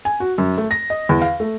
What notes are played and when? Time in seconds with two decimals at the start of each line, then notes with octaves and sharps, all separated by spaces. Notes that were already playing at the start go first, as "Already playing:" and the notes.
0.05 G#5
0.20 F#4
0.38 F#2
0.57 A3
0.71 A#6
0.90 D#5
1.09 E2
1.22 F5
1.40 A3